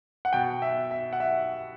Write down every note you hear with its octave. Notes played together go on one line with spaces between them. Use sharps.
F#5
B2 G5
E5
E5
F#5
E5